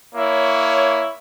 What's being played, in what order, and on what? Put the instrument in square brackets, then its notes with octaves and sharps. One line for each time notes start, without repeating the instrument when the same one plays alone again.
[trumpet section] A#3 E4 C#5